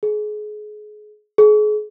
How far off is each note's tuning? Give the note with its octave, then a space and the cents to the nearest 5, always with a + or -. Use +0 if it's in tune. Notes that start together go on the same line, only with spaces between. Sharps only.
G#4 +30
G#4 +35